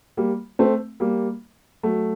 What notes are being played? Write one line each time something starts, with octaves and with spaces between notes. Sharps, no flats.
G3 A#3
A3 C4
G3 A#3
F#3 A3